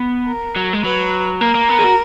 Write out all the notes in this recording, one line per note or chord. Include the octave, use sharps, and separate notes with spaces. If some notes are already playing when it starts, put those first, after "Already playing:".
Already playing: B3
A#4
F#3
G#3
F#3 B4
A#3 A#4
A#3
B3
G#4
F#4